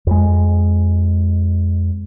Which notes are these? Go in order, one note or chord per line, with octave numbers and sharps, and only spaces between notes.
F2 G#3